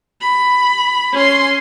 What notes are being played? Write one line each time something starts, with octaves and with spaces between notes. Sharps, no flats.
B5
C#4 C6